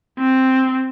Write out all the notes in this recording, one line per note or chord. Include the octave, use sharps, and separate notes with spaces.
C4